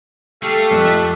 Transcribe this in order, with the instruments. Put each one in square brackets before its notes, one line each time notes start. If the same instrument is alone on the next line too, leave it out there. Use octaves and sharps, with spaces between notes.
[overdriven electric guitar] A3 [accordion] G4 A4 [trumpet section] F5
[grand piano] F2 [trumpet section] B4 E5